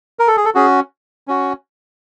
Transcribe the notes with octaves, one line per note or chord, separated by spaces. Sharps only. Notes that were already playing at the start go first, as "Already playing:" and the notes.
A#4
A4
G#4
A4
C#4 F#4 G#4
C#4 F#4